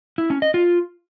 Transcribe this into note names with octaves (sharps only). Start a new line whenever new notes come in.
E4
C#4
D#5
F4